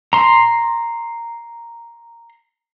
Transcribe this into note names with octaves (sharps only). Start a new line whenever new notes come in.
A#5 C6